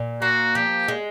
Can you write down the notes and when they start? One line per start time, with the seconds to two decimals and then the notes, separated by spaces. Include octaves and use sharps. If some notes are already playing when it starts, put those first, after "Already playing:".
Already playing: A#2
0.22 A#3 F#4
0.55 F3 G4
0.88 G#3